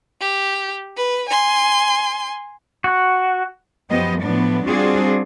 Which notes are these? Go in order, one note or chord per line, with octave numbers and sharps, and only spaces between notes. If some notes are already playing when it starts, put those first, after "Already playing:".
G4
B4
G#5 C6
F#4
F#2 F3 B3 G4 D#5
A2 F3 F#3 B3 D4
G3 C4 D4 F4 F#4 G#4